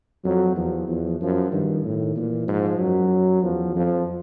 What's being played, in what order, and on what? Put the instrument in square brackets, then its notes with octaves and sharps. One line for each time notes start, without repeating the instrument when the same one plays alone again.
[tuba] F2 [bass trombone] F#3
[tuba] E2 [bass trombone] F3
[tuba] E2 [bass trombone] F3
[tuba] F#2 [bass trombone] F3
[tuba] G2 [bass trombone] D#3
[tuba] A2 [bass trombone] D#3
[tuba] A#2 [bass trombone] E3
[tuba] G#2 [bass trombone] F3
[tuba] F#2 [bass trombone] F#3
[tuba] E2 [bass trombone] F3
[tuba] F2 [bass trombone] F3